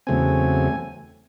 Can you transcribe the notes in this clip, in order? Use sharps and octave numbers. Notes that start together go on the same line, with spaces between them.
E2 C#3 F#3 A3 C4 G#5